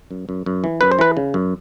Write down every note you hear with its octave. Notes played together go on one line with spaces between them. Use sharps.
F#2
F#2
F#2
E3
F#2 B4
C5
E3 B4
C#3
F#2